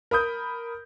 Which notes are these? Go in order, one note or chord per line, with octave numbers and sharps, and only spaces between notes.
A#4 B5 D#6 G6